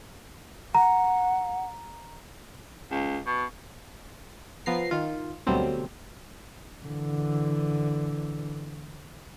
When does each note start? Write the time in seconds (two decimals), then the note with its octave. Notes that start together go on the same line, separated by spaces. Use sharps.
0.75 F#5 A#5
2.91 C#2
3.26 B2
4.66 F3 B3 A#5 C7
4.91 D#3 F4
5.47 D2 B2 F#3 G3 A3 C4
6.84 D3 E3